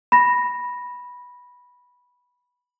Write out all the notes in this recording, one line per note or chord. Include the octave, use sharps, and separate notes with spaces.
B5 A#6